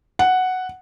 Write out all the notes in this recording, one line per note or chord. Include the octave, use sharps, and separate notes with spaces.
F#5